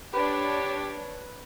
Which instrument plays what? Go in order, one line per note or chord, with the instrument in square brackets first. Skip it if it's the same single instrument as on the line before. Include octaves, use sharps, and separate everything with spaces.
[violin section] D4 C#5 [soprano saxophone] G4 [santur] B4